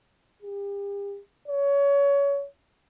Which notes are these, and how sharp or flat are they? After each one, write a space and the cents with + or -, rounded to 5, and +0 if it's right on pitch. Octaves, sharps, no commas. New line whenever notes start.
G4 +40
C#5 +25